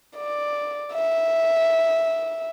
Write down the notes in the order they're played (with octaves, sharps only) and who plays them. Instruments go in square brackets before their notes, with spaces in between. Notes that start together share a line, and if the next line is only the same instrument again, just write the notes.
[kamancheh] D5
E5